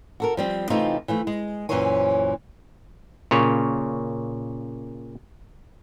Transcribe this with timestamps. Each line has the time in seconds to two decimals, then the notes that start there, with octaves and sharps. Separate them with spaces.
0.20 F#4 A4 A#4
0.37 F3 G3 C4
0.70 C3 E3 A3 C4 D#4 F4
1.08 E3 F3 A3
1.27 G#3
1.69 F#2 A#2 E3 C5 C#5 G#5
3.31 A#2 C#3 C#5